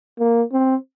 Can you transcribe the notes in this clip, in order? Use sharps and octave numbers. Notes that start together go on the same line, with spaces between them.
A#3
C4